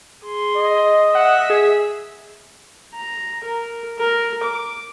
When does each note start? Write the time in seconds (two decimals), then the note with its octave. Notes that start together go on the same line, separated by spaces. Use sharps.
0.24 G#4 C6
0.57 D#5
1.15 E5 F#5
1.50 G#4
2.94 A#5
3.45 A#4
3.99 A#4
4.44 D6